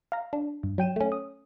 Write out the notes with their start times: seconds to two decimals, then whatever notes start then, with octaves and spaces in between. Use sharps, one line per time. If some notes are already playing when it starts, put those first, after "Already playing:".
0.12 F5 A#5
0.33 D4
0.63 G2
0.78 F#3 G5 D#7 E7
0.96 A3 C#4
1.12 D#6